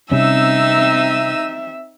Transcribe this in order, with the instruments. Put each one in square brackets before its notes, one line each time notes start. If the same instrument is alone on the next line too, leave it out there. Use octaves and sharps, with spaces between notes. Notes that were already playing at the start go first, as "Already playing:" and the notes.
[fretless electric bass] C3 G3 C#4 [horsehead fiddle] C4 E5 [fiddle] D#4 E6